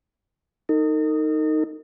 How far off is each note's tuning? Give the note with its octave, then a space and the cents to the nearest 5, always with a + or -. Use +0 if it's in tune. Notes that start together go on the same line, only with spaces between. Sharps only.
D#4 +0 A#4 -45